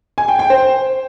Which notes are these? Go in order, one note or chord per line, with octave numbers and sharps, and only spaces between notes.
G#5
G5
G5
C5